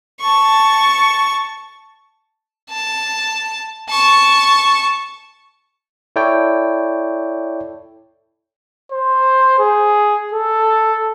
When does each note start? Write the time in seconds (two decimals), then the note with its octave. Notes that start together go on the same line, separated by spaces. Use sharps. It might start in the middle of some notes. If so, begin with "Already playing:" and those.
0.20 A5 C#6
2.70 A5
3.90 A5 C#6
6.16 E4 A4 C#5 D5 G5
8.92 C5
9.59 G#4
10.33 A4